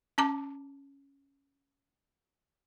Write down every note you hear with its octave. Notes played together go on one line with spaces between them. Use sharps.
C#4 A5 A#5 D6